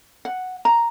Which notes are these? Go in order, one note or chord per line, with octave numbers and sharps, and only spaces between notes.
F#5
A#5